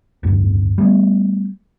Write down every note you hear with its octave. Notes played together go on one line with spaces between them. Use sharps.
D1 G1 E2 G2
G3 A3 B3